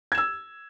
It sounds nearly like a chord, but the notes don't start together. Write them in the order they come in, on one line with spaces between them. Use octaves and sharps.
G#6 E7 E6